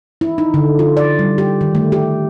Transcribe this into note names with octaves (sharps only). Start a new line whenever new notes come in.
E4
D#4
D3
F4
D5
G3
G4
D#3
A3
G4